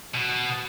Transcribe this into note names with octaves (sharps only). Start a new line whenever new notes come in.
B2